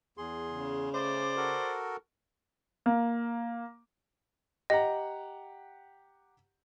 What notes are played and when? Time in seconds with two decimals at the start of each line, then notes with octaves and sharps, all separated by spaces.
0.18 E2 G#4 C6
0.51 C#3
0.93 A3 C#4 C5 D5
1.37 F#4 A4 A#4
2.86 A#3
4.70 G4 D#5 F#5 A#5